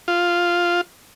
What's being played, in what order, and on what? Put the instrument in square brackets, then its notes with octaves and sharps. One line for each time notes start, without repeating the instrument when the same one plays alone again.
[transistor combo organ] F4